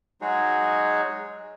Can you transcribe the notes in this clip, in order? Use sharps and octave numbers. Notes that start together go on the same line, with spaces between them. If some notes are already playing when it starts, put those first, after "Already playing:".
F#3 G#3 D#4 F#4 G#4 C#5